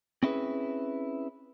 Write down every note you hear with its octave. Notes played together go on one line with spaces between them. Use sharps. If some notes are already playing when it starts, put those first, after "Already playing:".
C4 C#4 E4 G#4 B4